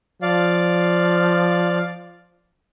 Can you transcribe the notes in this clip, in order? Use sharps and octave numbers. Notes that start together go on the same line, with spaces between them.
F3 D5 F5